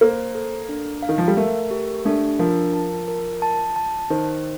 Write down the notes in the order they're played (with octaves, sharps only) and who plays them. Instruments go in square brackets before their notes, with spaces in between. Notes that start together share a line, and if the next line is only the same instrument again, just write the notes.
[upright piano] A#3 [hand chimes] C5
[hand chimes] A4
D4
F5
[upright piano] D#3
F3
G3
[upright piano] A3 [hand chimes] A#4
[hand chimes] G4
[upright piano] A3 [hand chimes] D4
[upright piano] F3 [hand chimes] A#4
[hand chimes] A5
A#4
A5
A5
[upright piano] D#3 [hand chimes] C5